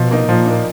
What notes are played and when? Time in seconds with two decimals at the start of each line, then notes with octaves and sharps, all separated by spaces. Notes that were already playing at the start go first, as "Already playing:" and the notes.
Already playing: B2 F3
0.11 A#3 D#4
0.29 A#2 F3
0.46 A#3 D#4